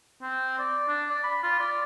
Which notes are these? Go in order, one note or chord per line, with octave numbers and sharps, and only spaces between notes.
C4
D5
D4
D5
B5
F4
D5